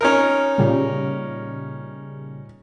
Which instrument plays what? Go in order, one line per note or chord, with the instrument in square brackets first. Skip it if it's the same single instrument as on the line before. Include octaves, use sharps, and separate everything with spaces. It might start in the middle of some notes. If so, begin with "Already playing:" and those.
[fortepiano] C#4 D#4 A#4
[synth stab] A#2 C#3 G3